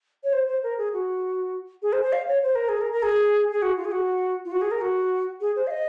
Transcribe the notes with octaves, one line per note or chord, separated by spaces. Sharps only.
C#5
C5
C5
A#4
G#4
F#4
G#4
C5
C5
F5
C#5
C5
A#4
G#4
A#4
A#4
G#4
G#4
F#4
F4
G#4
F#4
F4
F#4
G#4
A#4
F#4
G#4
C5
F5
D#5